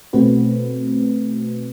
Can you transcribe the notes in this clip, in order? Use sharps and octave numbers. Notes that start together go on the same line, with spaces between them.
B2 A3 C4 F#4 B4